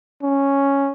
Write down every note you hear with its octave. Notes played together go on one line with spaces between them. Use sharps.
C#4